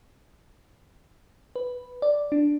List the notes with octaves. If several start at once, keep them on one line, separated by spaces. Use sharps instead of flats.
B4
D5
D4